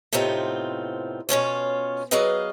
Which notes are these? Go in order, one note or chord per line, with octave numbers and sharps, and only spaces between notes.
A2 C3 B3 C4 D#4 F4
B2 C#4 F4 C#5
F#3 B3 G#4 B4 D#5 F5